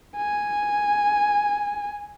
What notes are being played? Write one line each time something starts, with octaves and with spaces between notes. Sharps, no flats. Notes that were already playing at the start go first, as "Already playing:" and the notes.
G#5